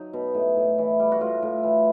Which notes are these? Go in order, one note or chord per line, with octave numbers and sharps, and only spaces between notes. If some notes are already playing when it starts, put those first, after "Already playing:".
Already playing: F#3 D#4
B2
A2
A2
E3
G3
F#4
A2 F4
A2
E3